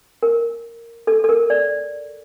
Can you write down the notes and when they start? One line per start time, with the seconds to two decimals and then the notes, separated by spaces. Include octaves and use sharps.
0.23 A#4
1.07 A4
1.24 A4
1.29 A#4
1.50 D5